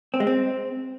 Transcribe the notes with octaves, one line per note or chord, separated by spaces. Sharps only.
C4
G#3
C4